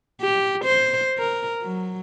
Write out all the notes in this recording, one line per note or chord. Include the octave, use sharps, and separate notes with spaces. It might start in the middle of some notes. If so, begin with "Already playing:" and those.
G4
C5
A#4
F#3